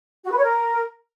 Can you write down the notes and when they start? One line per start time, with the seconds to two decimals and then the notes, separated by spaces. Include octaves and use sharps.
0.25 F#4
0.31 B4
0.37 C#5
0.43 A#4